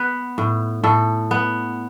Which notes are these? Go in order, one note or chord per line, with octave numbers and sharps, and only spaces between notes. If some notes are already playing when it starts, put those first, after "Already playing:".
Already playing: B3 B4
A2
A2 A4
B3